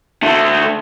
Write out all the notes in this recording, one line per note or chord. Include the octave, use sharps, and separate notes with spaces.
D3 A3